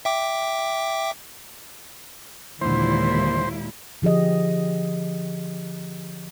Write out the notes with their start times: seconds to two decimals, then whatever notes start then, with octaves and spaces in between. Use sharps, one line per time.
0.05 E5 G5 D6
2.61 D#2 A#2 D3 E3 G#3 E4 C5
4.02 D3 F3 G4 G#4 D#5